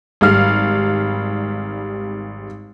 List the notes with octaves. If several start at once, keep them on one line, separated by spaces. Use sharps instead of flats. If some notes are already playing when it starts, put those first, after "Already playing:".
G#1 G3 F5 F6